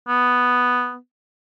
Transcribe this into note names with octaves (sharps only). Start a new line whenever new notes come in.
B3